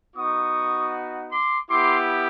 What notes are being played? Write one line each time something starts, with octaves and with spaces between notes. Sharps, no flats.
B3 D#4 F#4 C#6 D#6
C6 D6
B3 E4 G4 C6 D6